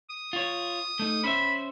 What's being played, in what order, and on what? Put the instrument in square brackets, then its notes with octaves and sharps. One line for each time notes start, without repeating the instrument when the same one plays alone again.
[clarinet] D#6
[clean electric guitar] F4 C#5
A3 D#4
[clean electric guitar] C#4 C5 E5 [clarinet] B5